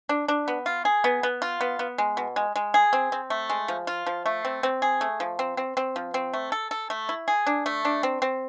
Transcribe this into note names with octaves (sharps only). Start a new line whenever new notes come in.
D4
D4
B3
F4
G#4
B3
B3
F4
B3
B3
G#3
B2
G#3
G#3
G#4
C4
C4
A3
G#3
F3
F4
F3
A3
C4
C4
G#4
A3
F3
C4
C4
C4
F3
C4
A3
A4
A4
A3
E4
G#4
D4
A3
D4
C4
C4